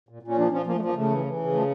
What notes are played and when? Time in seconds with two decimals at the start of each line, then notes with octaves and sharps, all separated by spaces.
0.09 A#2
0.23 A#2
0.28 C#4
0.37 F3 D4
0.51 F3 C#4
0.66 F3 A#3
0.76 A3
0.80 F3
0.85 A#3
0.96 C#3 A3
1.10 E3
1.25 E3
1.39 C#3
1.54 F3 A3